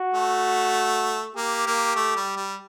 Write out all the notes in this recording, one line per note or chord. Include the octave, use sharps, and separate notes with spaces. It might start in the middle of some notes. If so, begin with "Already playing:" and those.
Already playing: F#4
A3
A#3 G4
A#3
A3
G3
G3